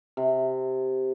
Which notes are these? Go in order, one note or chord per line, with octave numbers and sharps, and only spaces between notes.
C3